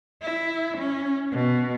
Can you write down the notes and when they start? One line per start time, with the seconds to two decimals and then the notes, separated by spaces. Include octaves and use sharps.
0.22 E4
0.78 C#4
1.32 B2